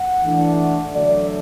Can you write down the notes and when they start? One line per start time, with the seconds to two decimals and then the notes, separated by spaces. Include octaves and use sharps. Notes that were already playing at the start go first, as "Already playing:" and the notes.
Already playing: F#5
0.24 E3 A3 D4
0.95 D3 F#3 A3 D5